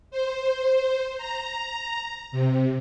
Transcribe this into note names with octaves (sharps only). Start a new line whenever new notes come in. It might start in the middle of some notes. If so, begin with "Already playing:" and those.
C5
A#5
C3